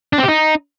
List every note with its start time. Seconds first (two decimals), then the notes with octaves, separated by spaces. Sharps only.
0.13 D4
0.18 C4
0.23 G4
0.28 D#4